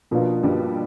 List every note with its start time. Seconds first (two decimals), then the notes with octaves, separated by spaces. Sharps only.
0.11 B2 F3 A#3 B3 D4 F4
0.43 G2 G3